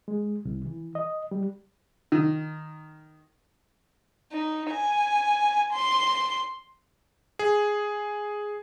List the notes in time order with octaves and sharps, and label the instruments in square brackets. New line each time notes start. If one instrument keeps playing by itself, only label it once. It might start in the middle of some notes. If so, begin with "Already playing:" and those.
[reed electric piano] G#3
C2
E3
D#5
G3
[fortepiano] D#3
[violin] D#4
G#5
C6
[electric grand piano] G#4